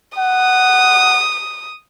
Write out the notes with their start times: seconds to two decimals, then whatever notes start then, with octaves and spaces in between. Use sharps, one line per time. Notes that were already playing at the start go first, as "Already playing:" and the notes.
0.18 F#5 D#6